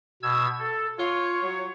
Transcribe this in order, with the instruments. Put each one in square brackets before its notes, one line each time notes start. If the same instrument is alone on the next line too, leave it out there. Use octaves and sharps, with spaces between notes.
[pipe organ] B2 E6 G#6
A4
[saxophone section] F4 [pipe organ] C#5
[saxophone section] F#3